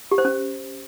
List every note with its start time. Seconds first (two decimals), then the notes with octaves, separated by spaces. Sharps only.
0.11 G4
0.18 C5
0.25 C#4